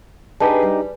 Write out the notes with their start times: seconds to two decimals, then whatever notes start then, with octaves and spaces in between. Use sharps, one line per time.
0.40 D4 D#4 G4 G#4 B4 A5
0.63 G3